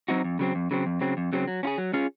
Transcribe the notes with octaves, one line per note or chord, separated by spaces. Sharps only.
F#3 C4 D#4 F#4
F2
C#3 F#3 C4
F2
C#3 F#3 C4
F2
C#3 F#3 C4
F2
C#3 F#3 C4
F#3
C#4 F4 G#4
F#3
C#4 F4 G#4